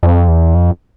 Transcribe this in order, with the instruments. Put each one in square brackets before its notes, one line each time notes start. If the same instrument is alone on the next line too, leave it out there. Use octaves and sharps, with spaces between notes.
[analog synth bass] F2
E2
F2